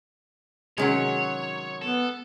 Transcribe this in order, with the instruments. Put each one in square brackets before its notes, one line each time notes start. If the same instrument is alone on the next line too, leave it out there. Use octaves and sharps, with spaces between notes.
[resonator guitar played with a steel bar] C3 D#3 F#3 [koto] G#3 C#4 [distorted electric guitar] C#5
[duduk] B3 [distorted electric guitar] A4